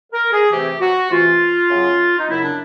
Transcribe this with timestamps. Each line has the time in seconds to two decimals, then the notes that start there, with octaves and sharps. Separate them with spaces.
0.13 A#4
0.32 G#4
0.51 C3 E3 A3 C4 G4
0.81 F#4
1.10 C3 E3 A3 C4 F4
1.70 F#2 C#3 F#3 B3
2.18 D#4
2.29 F#2 C#3 F#3 B3 E4
2.43 D4